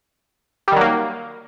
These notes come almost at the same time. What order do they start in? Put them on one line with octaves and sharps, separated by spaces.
G3 D#3 F#3 A#3